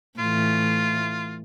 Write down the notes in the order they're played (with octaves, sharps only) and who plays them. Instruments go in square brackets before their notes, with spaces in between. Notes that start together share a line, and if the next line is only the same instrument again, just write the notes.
[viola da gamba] A2 E3 [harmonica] F4